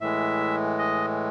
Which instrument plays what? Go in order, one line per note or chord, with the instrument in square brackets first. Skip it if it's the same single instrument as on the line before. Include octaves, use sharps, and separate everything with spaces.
[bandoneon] A2 E3 G#3 E5
D#5